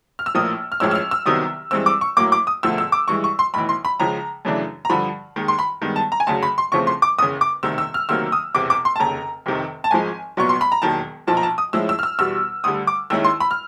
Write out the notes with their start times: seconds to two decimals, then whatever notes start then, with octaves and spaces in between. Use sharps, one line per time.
0.19 F6
0.26 E6
0.35 A#1 A2 F3 A#3 D#6
0.72 F6
0.80 A1 A2 F3 G#3 C#4 E6
0.91 E6
0.95 F6
1.11 E6
1.26 C2 C3 D#3 F#3 B3 D#6
1.71 G2 E3 G#3 C4 E6
1.86 D6
2.01 C#6
2.17 A2 F#3 A#3 D6
2.32 D6
2.47 D#6
2.63 E1 D2 D3 F3 A3 E6
2.78 E6
2.92 D6
3.08 G2 E3 G#3 C#6
3.24 C#6
3.39 C6
3.54 B1 A2 E3 B5
3.69 C6
3.85 B5
4.00 C#2 C#3 F3 A#5
4.45 F#2 C#3 E3 A3 D4
4.85 A#5
4.90 G2 D3 F3 B5
5.36 D#2 D#3 G#3
5.48 C6
5.59 B5
5.82 G2 D#3 G#3 B3
5.96 A5
6.12 A#5
6.20 G#5
6.27 D2 C#3 F#3 A5
6.43 B5
6.58 C6
6.72 E2 C#3 F3 A3 C4 C#6
6.87 C6
7.02 D6
7.18 F#1 E2 C#3 D#6
7.41 D6
7.63 E1 D2 C3 D#3 E6
7.78 E6
7.94 F6
8.09 D2 C3 D#3 F#3 A#3 E6
8.32 D#6
8.54 E1 E2 C3 D6
8.70 D6
8.85 C6
8.96 A5
9.00 F1 D#2 C#3 A#5
9.46 F1 F2 C3 D#3
9.84 A5
9.91 G#1 G#2 F3 G#3 G#5
10.37 C2 A#2 F#3 B3 C#6
10.49 C6
10.61 B5
10.72 A#5
10.82 E1 D#2 D#3 F#3 A5
11.27 B1 A#2 F3 A5
11.37 A#5
11.43 A5
11.58 D#6
11.73 A2 F3 G#3 C#4 E4 E6
11.89 E6
11.99 F6
12.03 E6
12.19 E2 B2 G3 E6
12.64 D2 D3 G3 D#6
12.87 D6
13.10 D#2 D#3 G#3 C#4 E4 E6
13.25 C6
13.40 B5
13.51 F6